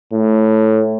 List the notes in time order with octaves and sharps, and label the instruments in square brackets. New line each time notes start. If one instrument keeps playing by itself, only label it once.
[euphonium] A2